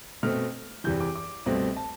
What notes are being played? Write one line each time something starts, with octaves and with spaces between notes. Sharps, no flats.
B2 A3 C4 F6
E2 C3 E3 G6
D6
D6
C2 B2 A3 C4
A5